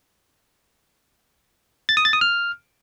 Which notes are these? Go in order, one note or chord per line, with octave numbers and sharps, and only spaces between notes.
A6
D#6
A6
D#6
F6